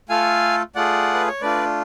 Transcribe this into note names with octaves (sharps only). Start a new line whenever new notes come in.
A3 F4 A4 F5 G#5
A3 F4 G#4 D5 F#5
B4
C#5
A3 D4 F4 B4 D5